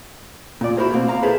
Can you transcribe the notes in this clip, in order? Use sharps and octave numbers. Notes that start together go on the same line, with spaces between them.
A#2 D5
E4 F#4 A#4 C5
B2 A#3 C4
F5 A#5
E4 G#4 A4 B4 C5